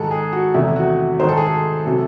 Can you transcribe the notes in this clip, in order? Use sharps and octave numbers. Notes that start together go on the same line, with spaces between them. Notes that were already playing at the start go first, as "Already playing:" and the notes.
Already playing: G#2 D#3 G#3 A4
G#4
F#4
E2 C3 D#3 A3 E4
F#4
G#2 D#3 A3 C5
A4
G#4
A4
C3 F#3 A3